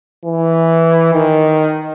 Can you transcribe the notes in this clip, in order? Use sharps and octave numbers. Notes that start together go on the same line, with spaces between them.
E3
D#3